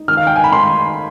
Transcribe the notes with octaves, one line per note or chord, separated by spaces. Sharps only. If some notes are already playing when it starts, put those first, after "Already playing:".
Already playing: D#4
D#3 F6
F5
G5
G#5
B5
D#3 C6